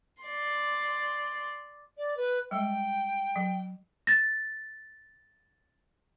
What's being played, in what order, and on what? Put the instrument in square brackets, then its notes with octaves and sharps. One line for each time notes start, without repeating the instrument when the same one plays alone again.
[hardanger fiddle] D5 C6
[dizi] D5
B4
[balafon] G3 G#3 [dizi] G5
[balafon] F#3
[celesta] A6 A#6